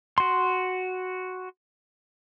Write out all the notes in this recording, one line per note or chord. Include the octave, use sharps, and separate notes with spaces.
F#4 C6